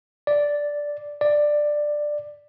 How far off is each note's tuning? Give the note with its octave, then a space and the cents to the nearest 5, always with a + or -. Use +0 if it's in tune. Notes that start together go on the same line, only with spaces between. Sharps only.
D5 -5
D5 +10